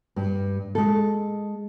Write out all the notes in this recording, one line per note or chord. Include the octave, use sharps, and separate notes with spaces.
G2
G#3 A4